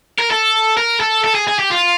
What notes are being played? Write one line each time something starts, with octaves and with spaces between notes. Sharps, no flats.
A#4
A4
A#4
A4
A4
G#4
G#4
G4
F4